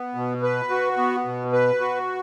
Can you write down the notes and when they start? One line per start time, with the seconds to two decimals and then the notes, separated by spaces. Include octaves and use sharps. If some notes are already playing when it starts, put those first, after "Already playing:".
Already playing: B3
0.15 B2
0.43 B4
0.70 F#4
0.98 B3
1.25 B2
1.53 B4
1.81 F#4